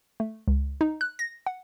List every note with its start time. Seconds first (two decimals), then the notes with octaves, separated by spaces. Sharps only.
0.20 A3
0.48 C#2
0.81 D#4
1.01 F#6
1.19 A#6
1.46 F#5